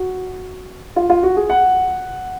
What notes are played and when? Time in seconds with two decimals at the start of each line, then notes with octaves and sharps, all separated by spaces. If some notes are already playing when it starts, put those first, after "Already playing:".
Already playing: F#4
0.96 F4
1.10 F4
1.23 F#4
1.37 G#4
1.50 F#5